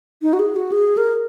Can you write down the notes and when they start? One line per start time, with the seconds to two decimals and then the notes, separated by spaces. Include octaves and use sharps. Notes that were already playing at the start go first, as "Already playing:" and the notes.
0.22 D#4
0.33 F#4
0.39 G#4
0.56 F#4
0.72 G#4
0.97 A#4